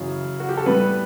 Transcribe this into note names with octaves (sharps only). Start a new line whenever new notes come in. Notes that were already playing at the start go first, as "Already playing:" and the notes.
Already playing: F#2 C#3 E3
F#4
G4
A4
A2 G3 B3 B4